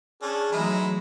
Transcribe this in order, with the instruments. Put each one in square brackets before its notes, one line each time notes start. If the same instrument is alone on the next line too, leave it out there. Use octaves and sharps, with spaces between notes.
[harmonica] C#4 D4 [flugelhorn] G#4
[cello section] E3 F#3 A3 [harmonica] G#3 D#4 E4